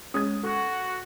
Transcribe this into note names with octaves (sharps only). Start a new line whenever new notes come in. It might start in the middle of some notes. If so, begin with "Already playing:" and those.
G#3 C#4 D#6 G#6
F#4 A4